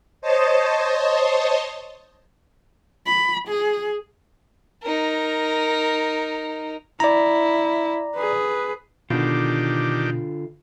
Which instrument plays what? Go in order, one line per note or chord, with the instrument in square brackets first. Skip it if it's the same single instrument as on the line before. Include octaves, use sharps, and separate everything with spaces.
[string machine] C5 C#5 D#5 A5
[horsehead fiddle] B5
G#4
[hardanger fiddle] D#4 A#4
[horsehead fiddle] E4 [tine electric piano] D5 A#5
[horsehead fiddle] G#4 B4
[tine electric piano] B2 [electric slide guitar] D3 F4 [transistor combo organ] D#3 D4 G4